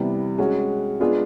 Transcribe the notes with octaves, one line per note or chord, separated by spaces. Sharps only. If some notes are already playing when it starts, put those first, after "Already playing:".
Already playing: C3 E3 G3 B3
G#3 C#4 F#4
G#3 B3 D4 F4 G#4